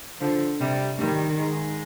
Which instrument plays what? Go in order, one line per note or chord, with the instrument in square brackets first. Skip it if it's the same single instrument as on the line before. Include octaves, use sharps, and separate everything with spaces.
[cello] D3 [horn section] F3
[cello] C3 [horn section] G3
[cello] D#3 [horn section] G3
[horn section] G#2 G#3